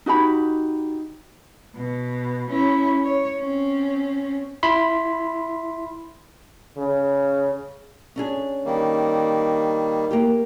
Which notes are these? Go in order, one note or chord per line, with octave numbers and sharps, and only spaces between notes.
D#4 F#4 G4 B5
B2
C#4 E4
C#5
C4 C#4
E4 B5 C6
C#3
C#4 D4 G#4
D#3 G3 A#3
A#3 E4 G4